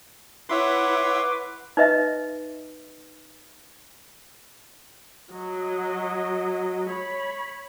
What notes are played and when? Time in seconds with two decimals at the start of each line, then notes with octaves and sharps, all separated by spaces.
0.49 E4 B4 C#5 E5 F#5 C6 D6
1.77 D#4 B4 D#5 E5
5.30 F#3 D#5
6.89 C#5 B5